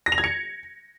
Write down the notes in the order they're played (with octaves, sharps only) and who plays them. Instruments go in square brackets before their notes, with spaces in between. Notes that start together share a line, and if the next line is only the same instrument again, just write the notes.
[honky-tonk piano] A#6
F7
G#6
C#7